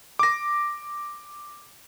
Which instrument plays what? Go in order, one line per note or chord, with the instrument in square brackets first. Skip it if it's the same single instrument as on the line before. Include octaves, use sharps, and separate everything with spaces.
[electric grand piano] D6 A#6